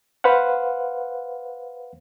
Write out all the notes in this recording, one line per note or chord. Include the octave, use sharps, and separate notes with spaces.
B4 C5 F5 F#5